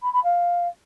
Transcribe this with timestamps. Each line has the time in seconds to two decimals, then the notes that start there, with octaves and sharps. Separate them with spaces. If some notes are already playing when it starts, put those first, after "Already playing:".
0.02 B5
0.13 B5
0.24 F5